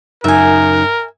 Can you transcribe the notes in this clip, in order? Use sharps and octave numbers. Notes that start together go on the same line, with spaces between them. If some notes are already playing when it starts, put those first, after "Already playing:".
F#2 C#3 D#4 A#4 E5 G#5